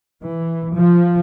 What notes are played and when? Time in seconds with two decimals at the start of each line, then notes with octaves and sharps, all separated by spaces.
0.25 E3
0.76 F3